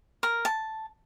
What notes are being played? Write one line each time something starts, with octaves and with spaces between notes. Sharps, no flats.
A#4
A5